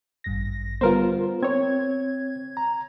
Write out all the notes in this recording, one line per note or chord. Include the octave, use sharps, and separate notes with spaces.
A1 G2 A#6
D3 G3 B3 F4 A#4 C5
C4 C#5 G#6
A#5